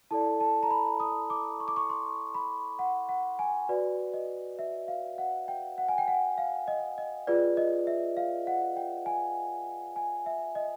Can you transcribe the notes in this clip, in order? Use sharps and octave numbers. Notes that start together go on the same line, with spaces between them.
E4 A4 D5 A5
A5
A#5
B5
D#6
D6
C#6
D6
C#6
C6
B5
F#5
F#5
G#5
F#4 B4 D5
D#5
E5
F5
F#5
G5
F#5
G#5
G5
F#5
F5
D#5
D#5
F4 G#4 B4 D5
D#5
E5
F5
F#5
G5
G#5
G#5
E5
D#5